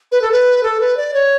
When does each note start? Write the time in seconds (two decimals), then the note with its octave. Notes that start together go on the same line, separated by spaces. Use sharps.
0.12 B4
0.22 A4
0.32 B4
0.63 A4
0.80 B4
0.97 D5
1.14 C#5